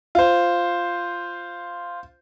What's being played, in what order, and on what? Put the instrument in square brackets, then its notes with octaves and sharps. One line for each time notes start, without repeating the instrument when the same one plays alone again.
[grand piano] F4 C5